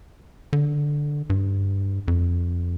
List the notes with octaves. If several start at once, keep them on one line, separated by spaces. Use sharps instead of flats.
D3
G2
F2